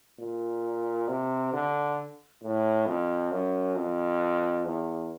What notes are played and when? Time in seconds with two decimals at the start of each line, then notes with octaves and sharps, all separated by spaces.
0.19 A#2
1.08 C3
1.53 D3
2.42 A2
2.86 F2
3.31 F#2
3.75 F2
4.65 E2